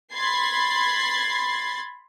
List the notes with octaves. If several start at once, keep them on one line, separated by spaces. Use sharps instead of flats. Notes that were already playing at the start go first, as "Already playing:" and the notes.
B5 C6 G#6 A6 C7